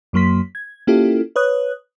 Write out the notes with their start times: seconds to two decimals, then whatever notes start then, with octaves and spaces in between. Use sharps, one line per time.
0.13 F#2 F#3 A#3 C6 B6
0.55 G#6
0.87 A#3 C#4 E4 F4 G4 A4
1.36 B4 C#5 D#6 F#6